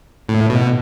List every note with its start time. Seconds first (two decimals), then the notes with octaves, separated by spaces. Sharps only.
0.29 A2
0.50 B2